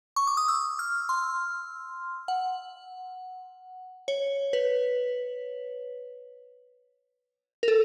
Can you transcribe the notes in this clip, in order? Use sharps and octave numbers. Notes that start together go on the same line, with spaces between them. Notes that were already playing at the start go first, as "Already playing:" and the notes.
C#6
D6
D#6
E6
F6
C6
F#5
C#5
B4
A#4
A4